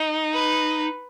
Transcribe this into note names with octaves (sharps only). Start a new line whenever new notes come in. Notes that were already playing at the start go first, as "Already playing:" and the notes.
Already playing: D#4
B4